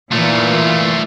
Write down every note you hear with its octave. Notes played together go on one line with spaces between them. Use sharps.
A#2 E3 A3 F4